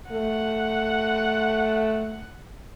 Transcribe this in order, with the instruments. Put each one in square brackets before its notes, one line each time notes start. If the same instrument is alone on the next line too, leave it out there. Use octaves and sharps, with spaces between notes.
[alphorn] A3 [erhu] F#5